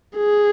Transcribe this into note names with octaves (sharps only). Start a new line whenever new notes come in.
G#4